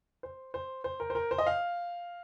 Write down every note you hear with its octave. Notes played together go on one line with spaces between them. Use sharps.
C5
C5
C5
A#4
C5
A#4
C5
D#5
F5